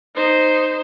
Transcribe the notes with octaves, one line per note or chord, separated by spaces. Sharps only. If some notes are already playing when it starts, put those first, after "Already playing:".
D#4 C5